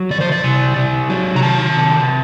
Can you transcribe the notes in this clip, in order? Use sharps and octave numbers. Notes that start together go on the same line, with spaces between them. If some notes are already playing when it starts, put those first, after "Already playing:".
Already playing: F#3
D#3 D5
C5
D5
C3
C3
F#3
A#5
D#3 A5
C3